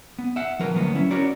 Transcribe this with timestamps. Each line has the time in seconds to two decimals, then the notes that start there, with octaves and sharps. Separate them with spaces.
0.18 B3
0.36 E5 F#5
0.59 F3 A#4 B4
0.76 D2 F#3 A#3 B3
0.95 C#4 E4
1.11 C#4 F#4 A#4 C#5 D5